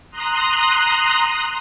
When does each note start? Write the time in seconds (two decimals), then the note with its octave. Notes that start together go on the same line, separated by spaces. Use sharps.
0.11 A#5 C6 D#6 F#6